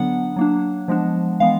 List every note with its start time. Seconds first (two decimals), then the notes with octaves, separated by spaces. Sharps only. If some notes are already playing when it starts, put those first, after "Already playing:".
Already playing: D3 F#3 B3 D4 F#5
0.36 F#3 A#3 D4
0.88 F3 G#3 B3 D4
1.40 E3 G#3 B3 F5